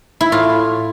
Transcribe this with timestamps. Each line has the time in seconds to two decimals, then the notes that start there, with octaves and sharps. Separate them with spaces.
0.21 E4
0.32 A2 F4